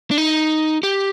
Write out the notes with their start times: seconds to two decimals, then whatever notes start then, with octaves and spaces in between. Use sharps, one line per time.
0.11 D4
0.18 D#4
0.83 G4